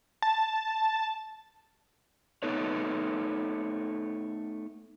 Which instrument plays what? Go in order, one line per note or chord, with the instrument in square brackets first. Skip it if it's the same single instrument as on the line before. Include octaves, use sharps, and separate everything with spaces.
[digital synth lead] A5
[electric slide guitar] A3 B3 D#4 A4 B4 C#5